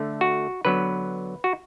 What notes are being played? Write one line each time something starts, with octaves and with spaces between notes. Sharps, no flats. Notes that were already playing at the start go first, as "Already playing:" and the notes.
Already playing: D3 A3
F#4
D3 F#3 B3 B4
F#4